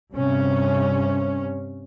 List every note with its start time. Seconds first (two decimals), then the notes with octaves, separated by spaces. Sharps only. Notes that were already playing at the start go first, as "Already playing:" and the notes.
0.11 G2 C3 C#4